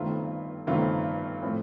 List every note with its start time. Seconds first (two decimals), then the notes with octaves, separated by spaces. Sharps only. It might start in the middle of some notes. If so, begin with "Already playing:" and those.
Already playing: G1 G2 D#3 A3 C4 F4
0.67 G1 G2 D#3 A3 C4 F4
1.42 A2 F3 A3 C4